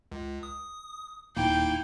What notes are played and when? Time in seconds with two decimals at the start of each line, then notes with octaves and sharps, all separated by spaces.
0.12 C#2
0.43 D#6
1.37 D#1 A#3 D#4 E4 G5